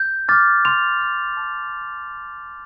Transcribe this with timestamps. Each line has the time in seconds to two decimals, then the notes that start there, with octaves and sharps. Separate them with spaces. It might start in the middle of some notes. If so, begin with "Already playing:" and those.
Already playing: G6
0.28 D6 F6 A6
0.65 C6 F7
1.01 F6
1.37 A5